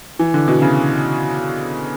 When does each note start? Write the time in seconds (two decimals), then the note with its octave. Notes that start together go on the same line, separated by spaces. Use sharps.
0.19 E3
0.34 D3
0.48 B2
0.62 C#3